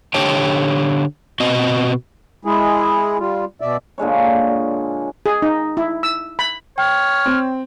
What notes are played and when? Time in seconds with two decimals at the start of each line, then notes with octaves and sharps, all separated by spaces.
0.14 D3 G4 C#5 G5 A5
1.40 B2 C4 F#4 D#5
2.45 G#3 E4 G#4
3.19 G3 F4
3.61 B2 D5 E5
3.98 A#2 D3 G#3 C#5
5.26 G#4
5.42 D#4
5.77 E4
6.03 E6
6.39 B5
6.78 C#5 G5 F6
7.26 C4